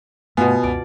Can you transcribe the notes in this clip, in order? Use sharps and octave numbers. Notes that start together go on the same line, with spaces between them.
G2 B2 A3 B3 F4 G#5
C#2 F#2 D5